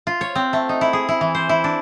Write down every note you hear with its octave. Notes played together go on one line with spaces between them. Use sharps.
F4
C#5
C4
A3
D#4
E4
G#4
E4
E3
C5
E4
D4